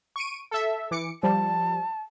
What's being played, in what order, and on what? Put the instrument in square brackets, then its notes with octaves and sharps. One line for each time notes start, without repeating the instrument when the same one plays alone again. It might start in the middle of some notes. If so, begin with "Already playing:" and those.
[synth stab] C#6 D7 D#7
A4 E5
E3 D6 C#7
[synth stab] F3 G3 [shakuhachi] A5